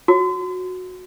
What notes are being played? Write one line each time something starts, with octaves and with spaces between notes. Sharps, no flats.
F#4